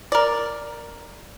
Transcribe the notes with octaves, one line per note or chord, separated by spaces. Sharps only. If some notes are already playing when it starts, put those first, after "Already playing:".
A#4 D5